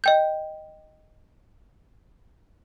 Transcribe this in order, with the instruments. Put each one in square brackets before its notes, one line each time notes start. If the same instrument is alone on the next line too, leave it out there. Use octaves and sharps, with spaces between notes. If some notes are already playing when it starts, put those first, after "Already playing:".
[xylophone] D#5 G5 G6